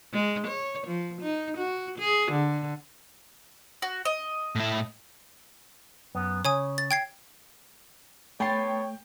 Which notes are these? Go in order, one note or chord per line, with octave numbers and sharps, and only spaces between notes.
G#3
C#5
F3
D#4
F#4
G#4
D3
F#4
D#5
A2 E4
F#2 B3
C#3 C#5 G#5 D#6
A6
G5 G#6 C7
A3 B3 C#5 G5 A5 C6